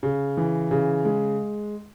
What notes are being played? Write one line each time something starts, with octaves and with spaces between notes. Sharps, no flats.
C#3
E3
C#3
G#3